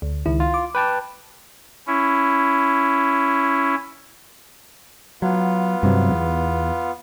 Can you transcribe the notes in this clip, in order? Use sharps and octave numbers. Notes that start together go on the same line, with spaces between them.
D2
C#2 D#3 E4
F4
D6
B4 G5 A5
C#4 E4
F#3 B3 F4
G2 C3 F#3
E2